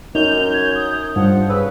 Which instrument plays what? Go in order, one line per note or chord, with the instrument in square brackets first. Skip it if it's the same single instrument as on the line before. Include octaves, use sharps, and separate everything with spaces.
[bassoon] F#2 [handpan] D#4 [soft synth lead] G6 [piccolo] F7
[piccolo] G#6
D#6
[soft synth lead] G2 [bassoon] F3 [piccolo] F#5
[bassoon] C#3 [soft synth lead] B4 [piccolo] E6